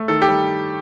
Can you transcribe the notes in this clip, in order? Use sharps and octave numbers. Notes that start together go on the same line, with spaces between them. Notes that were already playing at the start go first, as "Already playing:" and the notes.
Already playing: A3
D#3 A4
G4
G3